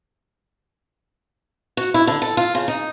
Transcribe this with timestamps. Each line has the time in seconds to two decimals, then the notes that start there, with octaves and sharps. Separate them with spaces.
1.77 F#4
1.94 E4
2.07 D3
2.22 A4
2.37 F4
2.55 C#3
2.68 D#4